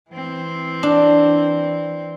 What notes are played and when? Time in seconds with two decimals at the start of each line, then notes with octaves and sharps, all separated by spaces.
0.10 E3 C4
0.83 D4